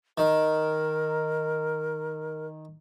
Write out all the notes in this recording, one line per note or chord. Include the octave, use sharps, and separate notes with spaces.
D#3 A#4